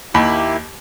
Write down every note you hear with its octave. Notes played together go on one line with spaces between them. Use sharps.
D#2 A#3 E4 G4 B5